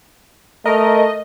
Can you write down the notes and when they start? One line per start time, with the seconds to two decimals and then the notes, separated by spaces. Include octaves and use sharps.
0.65 A3 A#4 D#5